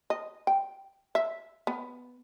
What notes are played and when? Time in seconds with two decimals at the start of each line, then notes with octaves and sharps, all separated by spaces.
0.10 D#5
0.47 G5
1.15 E5
1.67 B3